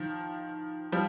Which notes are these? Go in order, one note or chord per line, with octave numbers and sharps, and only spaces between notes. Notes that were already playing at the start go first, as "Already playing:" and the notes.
Already playing: D#3 F3
F3 G3